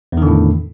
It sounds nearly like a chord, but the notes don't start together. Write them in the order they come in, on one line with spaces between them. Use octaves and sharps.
E2 D#3 D3 A2